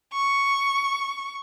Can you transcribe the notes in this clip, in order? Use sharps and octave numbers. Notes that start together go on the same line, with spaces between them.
C#6